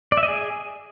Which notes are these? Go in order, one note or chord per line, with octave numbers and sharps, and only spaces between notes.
D5
E5
D#5
G#4